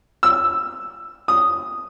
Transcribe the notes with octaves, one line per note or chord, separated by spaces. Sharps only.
E6
D#6